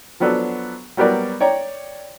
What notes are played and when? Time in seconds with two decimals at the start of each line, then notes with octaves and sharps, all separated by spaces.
0.20 F3 F#3 B3 D4 A4
0.97 F#3 G3 B3 A#4 D5
1.40 C#5 D5 G5 A#5